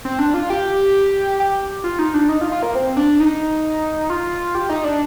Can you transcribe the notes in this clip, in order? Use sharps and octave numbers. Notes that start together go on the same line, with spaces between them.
C4
D4
F4
G4
G4
F4
D#4
D4
D#4
F4
F4
A#3
C4
D4
D#4
F4
G4
D#4
D4